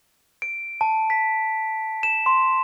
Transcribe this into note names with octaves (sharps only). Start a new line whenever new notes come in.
D7
A5
B6
E7
C6